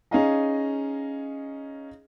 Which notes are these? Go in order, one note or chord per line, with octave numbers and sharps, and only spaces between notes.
C#4 D#4 G#4 D#5 F5 A#5